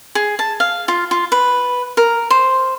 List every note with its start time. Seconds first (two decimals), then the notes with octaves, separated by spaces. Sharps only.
0.15 G#4
0.39 A5
0.60 F5
0.88 F4
1.11 F4
1.32 B4
1.97 A#4
2.30 C5